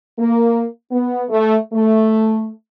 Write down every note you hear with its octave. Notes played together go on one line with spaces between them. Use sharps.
A#3
B3
A3
A3